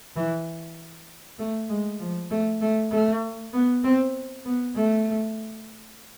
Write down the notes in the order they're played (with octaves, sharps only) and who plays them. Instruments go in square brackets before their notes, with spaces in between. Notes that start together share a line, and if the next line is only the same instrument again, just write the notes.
[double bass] E3
A3
G#3
F3
A3
A3
A3
B3
C4
B3
A3